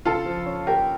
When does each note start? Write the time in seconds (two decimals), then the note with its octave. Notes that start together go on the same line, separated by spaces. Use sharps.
0.05 C#3 F4 A4
0.25 F3
0.46 C#4
0.67 A#3 G4 A#4